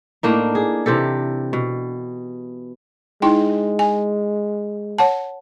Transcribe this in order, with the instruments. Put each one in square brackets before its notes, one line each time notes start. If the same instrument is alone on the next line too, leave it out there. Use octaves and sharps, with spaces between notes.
[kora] A2 A#3 D4 D#4
G#4
C3 E3 G4 A4
B2
[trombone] G#3 [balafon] D#4 E4 G5
[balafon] G#5
C#5 F#5 A5